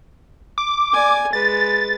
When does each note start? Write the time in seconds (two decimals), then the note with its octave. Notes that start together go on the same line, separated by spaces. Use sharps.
0.58 D6
0.93 D5 G#5
1.33 G#3 B4 A6